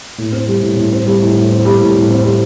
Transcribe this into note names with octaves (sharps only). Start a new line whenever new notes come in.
A2
C4
G3
A2
A2
C4
G3
A2
A2
C4
G3
A2
A2
C4
G3